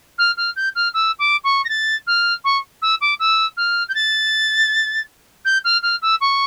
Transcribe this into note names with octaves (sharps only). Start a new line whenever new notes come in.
F6
F6
G6
F6
E6
D6
C#6
A#6
A6
F6
C#6
E6
D6
E6
F6
G6
A6
G6
F6
F6
E6
C#6